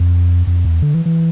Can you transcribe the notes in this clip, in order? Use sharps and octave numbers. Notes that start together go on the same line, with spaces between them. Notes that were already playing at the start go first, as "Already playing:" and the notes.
Already playing: F2
F2
E2
D3
E3
E3